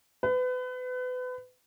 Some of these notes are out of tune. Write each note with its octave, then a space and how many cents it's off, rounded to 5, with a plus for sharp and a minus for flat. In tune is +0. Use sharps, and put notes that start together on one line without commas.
B4 +30